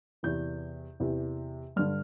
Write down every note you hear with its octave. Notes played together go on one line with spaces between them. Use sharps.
E2 C3 E3 G6
E2 C3 E3
G2 D3 F6